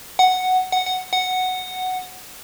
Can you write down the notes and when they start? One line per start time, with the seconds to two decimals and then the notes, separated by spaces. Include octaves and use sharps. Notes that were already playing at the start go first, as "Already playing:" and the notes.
0.19 F#5
0.72 F#5
0.86 F#5
1.13 F#5